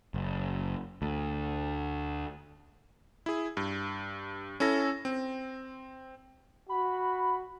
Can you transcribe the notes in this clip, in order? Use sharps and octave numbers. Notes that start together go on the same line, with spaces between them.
F#1
D2
E4 G#4
G2
C#4 E4 A4 A#6
C4
F#4 B5